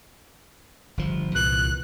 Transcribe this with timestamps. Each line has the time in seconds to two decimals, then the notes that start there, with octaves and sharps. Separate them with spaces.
0.97 G1 F3
1.35 C2 A#2 E3 F#6